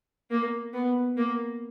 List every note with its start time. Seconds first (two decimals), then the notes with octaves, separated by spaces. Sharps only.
0.31 A#3
0.74 B3
1.17 A#3